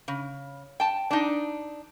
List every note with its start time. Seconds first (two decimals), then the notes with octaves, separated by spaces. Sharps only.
0.08 C#3
0.80 G5 A5
1.11 D4 D#4